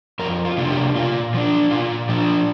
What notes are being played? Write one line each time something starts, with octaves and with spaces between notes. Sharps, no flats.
F2 A#4
F4
C3 A#3 D4 F4
G4
A#2 F4
F3 D4
A#2 F4
F3 D4